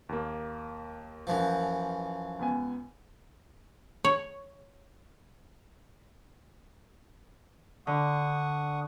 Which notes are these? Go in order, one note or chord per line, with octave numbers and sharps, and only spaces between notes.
D#2 A#3
F#2 E3 F3
C#2 B3 G#5
C#5
D3 F#5 C#6 D#6